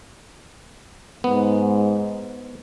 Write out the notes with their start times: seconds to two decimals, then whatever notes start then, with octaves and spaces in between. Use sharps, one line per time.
1.24 G#2 B3